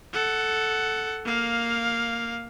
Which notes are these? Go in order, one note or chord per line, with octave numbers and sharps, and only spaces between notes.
A4 F#5
A#3 F5